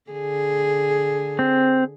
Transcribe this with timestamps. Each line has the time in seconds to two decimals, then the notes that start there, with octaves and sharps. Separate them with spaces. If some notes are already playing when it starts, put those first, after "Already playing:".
0.11 D3 G#4
1.39 C4